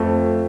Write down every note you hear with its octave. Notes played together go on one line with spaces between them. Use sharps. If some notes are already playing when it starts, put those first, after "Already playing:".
Already playing: F2 A3